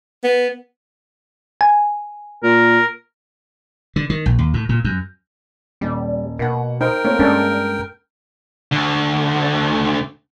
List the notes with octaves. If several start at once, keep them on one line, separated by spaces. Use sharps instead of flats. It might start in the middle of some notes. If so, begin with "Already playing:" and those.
B3
G#5
A#2 A#4
D3
D#3
A#1
D#2
A2
A#2
F#2
D#1 G3
B2 A#3 F#5
D#4 A#4 C5 G5
A3 A#3 C4 C#5
G2 G#3 C#4 D4 A4
D2 D3